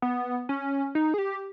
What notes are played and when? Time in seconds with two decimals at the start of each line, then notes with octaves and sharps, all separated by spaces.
0.02 B3
0.49 C#4
0.95 D#4
1.14 G#4
1.18 G4